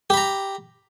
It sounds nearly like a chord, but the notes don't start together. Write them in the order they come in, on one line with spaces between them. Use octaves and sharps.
G4 B5 A#5